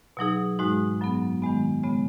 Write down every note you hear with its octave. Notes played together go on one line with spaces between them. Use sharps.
B2 F#3 D#4 G#4
G#2 G#3 D#4 F#4
F#2 F#3 B3
D#3 G#3 B3
C#3 G#3 B3